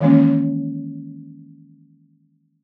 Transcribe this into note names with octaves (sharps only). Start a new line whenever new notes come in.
D#3 E3 G#3 A#3 C#4